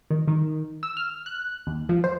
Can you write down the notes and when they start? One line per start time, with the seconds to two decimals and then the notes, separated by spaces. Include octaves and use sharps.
0.11 D#3
0.28 D#3
0.83 E6
0.97 F6
1.26 F#6
1.67 D#2
1.89 F3
2.04 C5